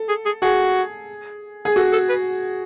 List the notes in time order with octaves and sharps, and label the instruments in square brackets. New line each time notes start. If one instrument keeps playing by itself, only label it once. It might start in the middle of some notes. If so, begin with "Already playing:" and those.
Already playing: [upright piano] A4
[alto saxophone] G#4
G#4
[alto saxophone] F#4 [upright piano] G#4
[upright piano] G#4
[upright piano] F#4 [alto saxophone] A4
[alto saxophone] A4
B4